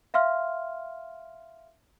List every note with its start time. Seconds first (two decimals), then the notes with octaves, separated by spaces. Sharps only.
0.14 E5 F5 C6 F6